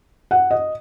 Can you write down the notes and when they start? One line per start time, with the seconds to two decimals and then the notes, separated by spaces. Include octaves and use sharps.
0.31 F#5
0.51 D#5